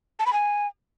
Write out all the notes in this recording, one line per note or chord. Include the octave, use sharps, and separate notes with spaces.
A5
B5
G#5